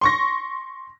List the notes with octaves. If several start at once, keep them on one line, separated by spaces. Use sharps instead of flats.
C6 C#6 A#6